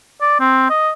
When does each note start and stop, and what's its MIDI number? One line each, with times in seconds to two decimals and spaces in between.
0.22 0.37 74
0.40 0.66 60
0.70 0.92 75